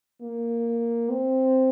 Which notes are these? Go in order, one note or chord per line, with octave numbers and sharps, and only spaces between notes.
A#3
C4